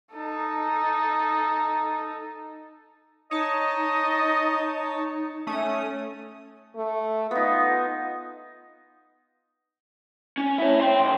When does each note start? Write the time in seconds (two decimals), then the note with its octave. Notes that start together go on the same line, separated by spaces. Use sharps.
0.15 D#4 A4
3.31 D#4 C#5 D#5 A5
5.47 A3 C#4 D#6
6.76 A3
7.31 B3 D#4 F4
10.38 C#4
10.58 E4 C#5
10.81 G5 C6
11.00 B1 E2